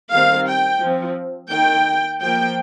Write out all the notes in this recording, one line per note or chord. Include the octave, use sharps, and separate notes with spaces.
D#3 G3 C4 F5
G5
F3 C4
D#3 A#3 G5
F3 A#3 G5